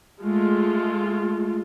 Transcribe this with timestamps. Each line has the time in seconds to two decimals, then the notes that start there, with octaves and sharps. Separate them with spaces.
0.21 G#3 A3 F4